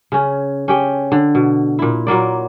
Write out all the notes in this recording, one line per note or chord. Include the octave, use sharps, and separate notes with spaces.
C#3 C#4
C#4 G4 G5
D3
B2
A#2 E4
A#2 F#3 A#3 D5